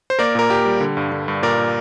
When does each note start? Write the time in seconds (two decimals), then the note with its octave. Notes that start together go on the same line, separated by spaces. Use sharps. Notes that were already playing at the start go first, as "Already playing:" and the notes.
0.10 C5
0.19 A#3 A#4 D5
0.35 A#2 A#4
0.50 A#2 G4
0.66 G3
0.80 D3
0.97 G2
1.12 D3
1.28 G2
1.42 A#2 A#4 D5
1.58 A#2